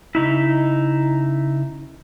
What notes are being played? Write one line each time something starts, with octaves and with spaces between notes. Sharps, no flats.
C#3 D#4 E4